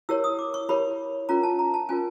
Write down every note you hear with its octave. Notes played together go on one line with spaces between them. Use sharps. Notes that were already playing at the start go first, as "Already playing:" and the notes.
E4 G4 A#4 C#5 E6
D#6
D6
C#6
E4 G4 A#4 C#5 B5
C#4 F4 A#4 A#5
A5
A#5
A5
C#4 F4 A#4 G#5